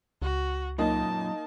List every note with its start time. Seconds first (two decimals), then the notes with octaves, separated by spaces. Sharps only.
0.22 C#2 F#4
0.78 F#2 A#2 A#3 D#4 D#5 A5